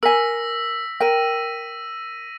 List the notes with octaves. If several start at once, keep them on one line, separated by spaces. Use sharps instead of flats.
A#4 G#5 E6 A#6 B6
A#4 G5 A#6 D#7